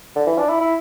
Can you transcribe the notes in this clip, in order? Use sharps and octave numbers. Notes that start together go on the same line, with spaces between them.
D3
E3
D4
E4
E4